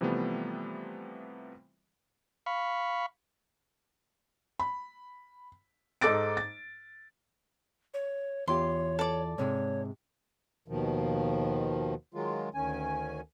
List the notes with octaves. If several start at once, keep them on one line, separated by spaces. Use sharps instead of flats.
C3 E3 F3 G3 A3 B3
F5 B5 C#6
B5
G#2 D#4 A4 D6 A6 D7
A6
C#5
E2 F4 G4 C#5 C6
A4 D5
G#2 C3 G#3 C#5
D#2 B2 D#3 F3
D#3 F#3 G#3 F4
D2 D#3 C#4 G#5